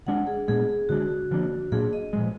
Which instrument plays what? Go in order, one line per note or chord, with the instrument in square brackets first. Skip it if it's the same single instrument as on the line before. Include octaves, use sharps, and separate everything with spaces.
[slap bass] D3 G#3 D4 [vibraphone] F#5
[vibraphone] G#4
[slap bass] A#2 G#3 B3 D4 [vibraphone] G#4
[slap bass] D3 G#3 D4 [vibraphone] F#4
[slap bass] D3 F3 A#3 D4
[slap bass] A#2 F#3 A#3 D4 [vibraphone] G#4
[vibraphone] D#5
[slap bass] A#2 F3 G#3